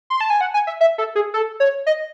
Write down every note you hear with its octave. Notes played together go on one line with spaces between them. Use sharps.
C6
A5
G#5
F#5
G#5
E5
E5
A4
G#4
A4
C#5
D#5